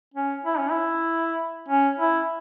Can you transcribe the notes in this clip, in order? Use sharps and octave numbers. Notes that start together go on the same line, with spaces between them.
C#4
E4
C#4
E4
C#4
E4